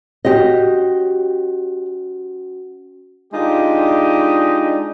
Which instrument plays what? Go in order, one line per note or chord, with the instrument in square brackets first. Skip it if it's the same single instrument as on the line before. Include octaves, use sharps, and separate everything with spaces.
[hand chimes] C#4 F#4 F#5 [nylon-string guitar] G4 D#5
[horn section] G#3 D4 D#4 F4 G4 D#5